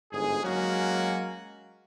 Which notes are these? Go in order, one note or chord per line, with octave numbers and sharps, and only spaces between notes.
G1 G#2 G#4
F#3 G#3 A#3 C#4 F#4